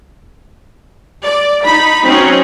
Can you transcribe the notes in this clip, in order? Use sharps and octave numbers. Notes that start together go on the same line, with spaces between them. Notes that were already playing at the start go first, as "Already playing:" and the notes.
D5
D#4 B5
F#3 C4 C#4 D#4